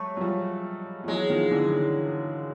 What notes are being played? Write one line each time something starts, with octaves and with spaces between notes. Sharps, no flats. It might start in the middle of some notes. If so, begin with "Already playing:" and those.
Already playing: F#3 G#3 A3
F#3
F3 G3
F3
E3 F#3 G#3
D#3 F3
D3 E3
E3